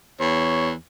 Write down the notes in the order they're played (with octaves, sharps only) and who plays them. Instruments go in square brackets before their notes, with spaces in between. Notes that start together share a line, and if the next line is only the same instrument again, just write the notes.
[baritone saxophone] E2 [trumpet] C#5